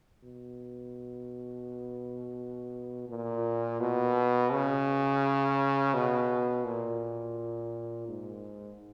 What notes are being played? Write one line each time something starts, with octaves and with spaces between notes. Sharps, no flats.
B2
A#2
B2
C#3
B2
A#2
G#2